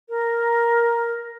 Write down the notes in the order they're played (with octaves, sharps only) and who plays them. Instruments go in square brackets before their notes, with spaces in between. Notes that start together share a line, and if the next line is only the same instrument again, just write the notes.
[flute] A#4